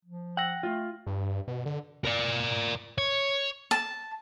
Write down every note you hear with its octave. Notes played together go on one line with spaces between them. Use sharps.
F3
F#5 G5 E6 A#6
A3 F4
G2
B2
D3
A#4 D5
C#5
A5